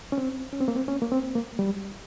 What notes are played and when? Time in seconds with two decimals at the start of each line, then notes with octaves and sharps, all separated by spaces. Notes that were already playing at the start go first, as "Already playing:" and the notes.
0.12 C#4
0.18 C4
0.53 C#4
0.61 C4
0.68 A#3
0.76 C4
0.88 C#4
1.02 A#3
1.12 C4
1.35 A#3
1.59 G3